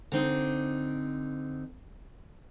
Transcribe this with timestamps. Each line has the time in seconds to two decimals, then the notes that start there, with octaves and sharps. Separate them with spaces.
0.12 D3 C4 D#4